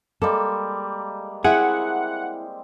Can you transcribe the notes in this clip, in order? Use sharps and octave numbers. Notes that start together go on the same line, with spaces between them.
G3 G#3 A#3 A4
C4 E4 G#4 F#5